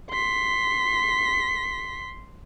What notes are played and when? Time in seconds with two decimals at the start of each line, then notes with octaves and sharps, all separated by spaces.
0.10 C6 B6